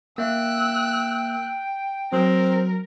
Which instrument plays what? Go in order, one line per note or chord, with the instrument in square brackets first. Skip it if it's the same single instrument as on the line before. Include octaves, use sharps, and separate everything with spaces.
[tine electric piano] A#3 E5 [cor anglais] G5 [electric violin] E6 F#6
[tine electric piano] F#3 [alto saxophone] C4 [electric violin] A#4